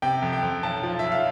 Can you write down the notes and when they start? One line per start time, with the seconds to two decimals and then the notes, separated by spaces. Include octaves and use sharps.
0.02 C3 G5
0.22 F2
0.33 G5
0.43 F2
0.63 B1 A5
0.83 F3
0.99 B1 E5
1.12 F5